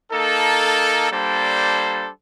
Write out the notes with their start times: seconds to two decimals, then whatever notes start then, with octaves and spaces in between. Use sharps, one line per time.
0.11 A#3 D#4 A4
1.10 G3 A#3 D4 A4 C5